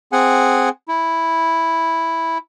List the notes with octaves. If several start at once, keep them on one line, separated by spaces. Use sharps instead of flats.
C4 G#4 F#5 G#5
E4